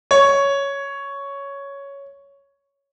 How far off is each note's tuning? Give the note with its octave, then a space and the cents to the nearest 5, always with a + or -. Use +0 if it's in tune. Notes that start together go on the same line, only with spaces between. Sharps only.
C#5 +5